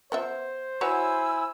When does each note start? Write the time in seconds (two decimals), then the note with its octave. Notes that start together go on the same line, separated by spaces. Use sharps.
0.12 B3 F4 C5 E5
0.81 E4 F#4 B4 C#5 G#5 E6